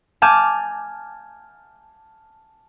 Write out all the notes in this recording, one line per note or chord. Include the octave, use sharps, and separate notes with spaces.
G#5 A5 D6 F6 G6